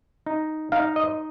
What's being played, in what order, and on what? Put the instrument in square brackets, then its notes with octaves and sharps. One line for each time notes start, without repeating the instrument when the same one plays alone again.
[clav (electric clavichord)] D#4
D#4 F5
D#5